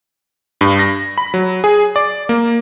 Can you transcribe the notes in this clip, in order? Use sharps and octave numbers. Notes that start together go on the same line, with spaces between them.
G2
A#6
B5
F#3
G#4
D5
A#3